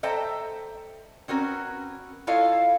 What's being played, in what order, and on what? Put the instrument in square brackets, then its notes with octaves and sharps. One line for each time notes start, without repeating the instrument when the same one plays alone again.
[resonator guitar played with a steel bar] A4 C5 D#5 E5 G5 A#5
C4 C#4 F#4 A#4 B4
E4 F4 A4 C#5 D#5 F5